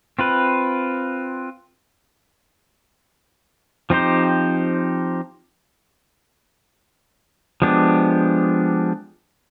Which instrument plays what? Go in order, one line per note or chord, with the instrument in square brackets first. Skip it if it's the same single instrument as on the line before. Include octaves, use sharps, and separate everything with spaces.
[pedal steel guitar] C4 F4 B4
F3 C4 D#4 G4 C5
F3 G#3 B3 D4 G4